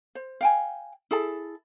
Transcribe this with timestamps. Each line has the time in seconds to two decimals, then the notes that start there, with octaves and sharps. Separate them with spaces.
0.15 C5
0.41 F5 G5 G#5
1.11 E4 G#4 A4 A5